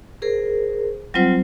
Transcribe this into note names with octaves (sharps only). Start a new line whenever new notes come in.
G#4 A#4 C5
F#3 G3 C4 F4 C5 F#5